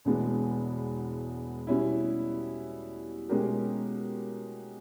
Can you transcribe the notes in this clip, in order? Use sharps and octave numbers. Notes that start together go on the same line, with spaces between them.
E1 E2 B2 G#3 B3
B2 G3 C#4 E4
B2 G#3 C#4 G4 A#4